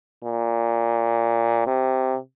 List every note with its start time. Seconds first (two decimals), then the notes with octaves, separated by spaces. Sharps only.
0.24 A#2
1.67 C3